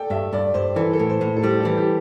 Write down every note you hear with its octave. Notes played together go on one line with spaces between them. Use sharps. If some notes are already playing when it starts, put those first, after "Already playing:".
Already playing: A4 D5 G5
G2 E5
G2 D5
G2 C5
E3 A4
A4
A2
C5
A2
A4
G3 C5
E3 A4
G4